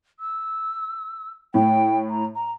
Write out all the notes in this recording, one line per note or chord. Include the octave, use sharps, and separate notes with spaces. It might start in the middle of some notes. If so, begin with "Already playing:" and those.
E6
A2 G5
A#5
A#5